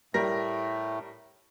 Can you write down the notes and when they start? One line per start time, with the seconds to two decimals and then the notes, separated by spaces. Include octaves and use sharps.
0.14 A2 G3 A3 A#4 A#6